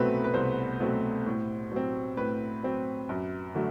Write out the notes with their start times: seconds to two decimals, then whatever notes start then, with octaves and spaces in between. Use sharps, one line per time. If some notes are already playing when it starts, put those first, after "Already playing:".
Already playing: C2 B2 F#3 A3 C4 B4
0.24 B4
0.34 C2 C5
0.80 B2 F#3 A3 C4
1.26 A2
1.72 F#3 C4
2.17 A2 B4
2.63 F#3 C4
3.09 F#2
3.55 D3 F#3 A3